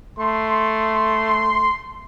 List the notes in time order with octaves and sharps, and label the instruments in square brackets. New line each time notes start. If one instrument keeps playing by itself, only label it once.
[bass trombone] A3 [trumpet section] C6